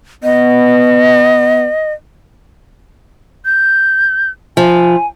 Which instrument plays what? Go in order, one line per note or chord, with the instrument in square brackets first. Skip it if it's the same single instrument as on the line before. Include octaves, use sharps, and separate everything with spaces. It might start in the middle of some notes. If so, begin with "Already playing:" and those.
[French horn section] B3 [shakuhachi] D#5
[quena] G6
[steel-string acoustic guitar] F3 [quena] G#5